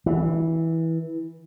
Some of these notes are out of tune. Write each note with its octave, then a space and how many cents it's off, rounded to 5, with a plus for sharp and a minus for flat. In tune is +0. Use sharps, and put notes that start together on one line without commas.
E3 -15